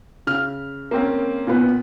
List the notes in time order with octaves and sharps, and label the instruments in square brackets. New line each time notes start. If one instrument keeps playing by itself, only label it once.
[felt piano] C#3 F6
[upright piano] A#3 C4 C#4
[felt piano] A#2 B3